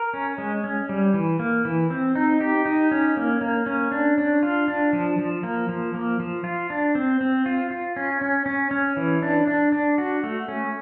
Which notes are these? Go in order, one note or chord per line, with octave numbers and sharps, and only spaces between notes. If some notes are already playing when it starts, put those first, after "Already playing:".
Already playing: A#4
C#4
G#3
C#4
G3
E3
A#3
E3
C4
D#4
G4
D#4
C#4
A#3
A#3
C#4
D4
D4
F4
D4
F3
F3
A#3
F3
A#3
F3
F4
D4
C4
C4
F4
F4
C#4
C#4
C#4
C#4
E3
D4
D4
D4
F#4
A3
C#4